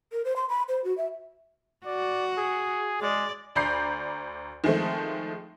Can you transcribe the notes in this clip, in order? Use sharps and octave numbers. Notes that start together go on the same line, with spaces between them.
A#4
C5
C6
B5
C5
F#4
E5
F#4 D5
G#4
G#3 D5
D2 D5 A#5 B5 G6 C7
D#3 F3 G#3 A3 C4